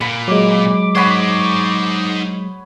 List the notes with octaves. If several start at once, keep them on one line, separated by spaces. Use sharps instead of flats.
A#2 B5
F#3 G#3 D6
D#4 C5 C#5 F#5 B5